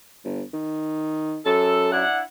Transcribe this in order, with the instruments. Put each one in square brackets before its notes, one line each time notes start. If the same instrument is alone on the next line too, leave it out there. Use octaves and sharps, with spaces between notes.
[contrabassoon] G1
D#3
[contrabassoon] F#2 [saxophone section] A4
[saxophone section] D4 E4 F#5